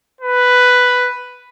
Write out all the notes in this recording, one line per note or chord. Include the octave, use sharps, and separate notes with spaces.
B4